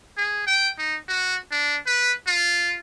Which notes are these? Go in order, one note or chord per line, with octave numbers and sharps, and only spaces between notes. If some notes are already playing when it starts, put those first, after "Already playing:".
G#4
G5
D#4
F#4
D4
B4
F4